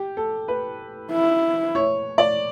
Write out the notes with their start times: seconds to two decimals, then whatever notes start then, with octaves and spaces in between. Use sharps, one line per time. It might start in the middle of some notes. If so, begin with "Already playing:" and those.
Already playing: G4
0.17 A4
0.48 B4
1.12 E4
1.75 C#5
2.18 D5